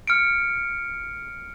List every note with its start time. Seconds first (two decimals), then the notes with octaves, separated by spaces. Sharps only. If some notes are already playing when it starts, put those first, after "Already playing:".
0.07 F6 C#7 D7